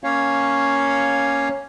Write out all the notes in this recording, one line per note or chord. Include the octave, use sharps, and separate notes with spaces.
A#3 C#4 C#5 F5